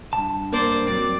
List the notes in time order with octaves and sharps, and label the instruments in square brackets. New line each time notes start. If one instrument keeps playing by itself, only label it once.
[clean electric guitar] G2 A5
[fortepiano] A#3 [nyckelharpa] C5 D5
[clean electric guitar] F#3 C4 [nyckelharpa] D5